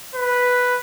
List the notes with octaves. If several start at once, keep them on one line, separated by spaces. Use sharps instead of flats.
B4